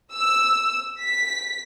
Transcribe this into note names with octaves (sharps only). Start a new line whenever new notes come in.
E6
B6